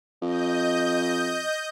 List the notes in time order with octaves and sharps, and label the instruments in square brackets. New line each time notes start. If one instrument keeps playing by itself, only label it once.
[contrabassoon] F2 [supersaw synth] D#5 G6